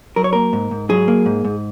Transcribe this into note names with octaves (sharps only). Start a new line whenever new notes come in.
F#3 A#4
C#5
A#3 A#4
G#2
G#2
F#3 G#4
A#3
G#2
G#2